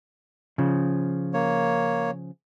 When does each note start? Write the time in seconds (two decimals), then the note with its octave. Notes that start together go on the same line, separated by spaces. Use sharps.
0.58 C#3 F3
1.34 A#3 C#5